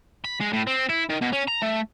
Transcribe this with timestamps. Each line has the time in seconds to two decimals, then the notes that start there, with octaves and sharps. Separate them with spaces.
0.24 B5
0.41 G#3
0.53 A2
0.67 C4
0.89 E4
1.10 D#3
1.22 B2
1.33 C#4
1.48 A#5
1.62 A3